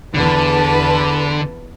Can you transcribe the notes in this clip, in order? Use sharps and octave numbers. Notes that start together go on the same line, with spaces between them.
E2 D3 B4 A5